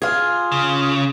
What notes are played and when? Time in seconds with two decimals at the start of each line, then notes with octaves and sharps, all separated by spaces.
0.02 F4 G#4
0.52 C#3